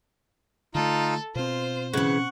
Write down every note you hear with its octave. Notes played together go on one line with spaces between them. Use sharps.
D3 A3 D#4 F4 A4
B2 C4 F4 C5
C#3 E3 F#5 C#6 F#6